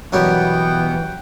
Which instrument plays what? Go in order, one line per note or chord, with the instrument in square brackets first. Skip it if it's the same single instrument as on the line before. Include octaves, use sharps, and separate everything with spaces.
[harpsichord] F#2 F#3 G3 [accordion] B2 B3 [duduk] E3 [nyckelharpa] F#5 G5